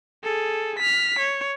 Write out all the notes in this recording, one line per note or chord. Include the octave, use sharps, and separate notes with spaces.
G#4 A4
F6 B6
C#5